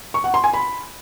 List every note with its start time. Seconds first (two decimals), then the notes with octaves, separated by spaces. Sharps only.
0.14 C#6
0.24 F#5
0.34 C6
0.44 G#5
0.53 B5